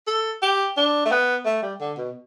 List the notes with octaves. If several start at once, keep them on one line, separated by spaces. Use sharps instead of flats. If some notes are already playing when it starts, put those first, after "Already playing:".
A4
G4
D4
A3
B3
A3
G3
D3
B2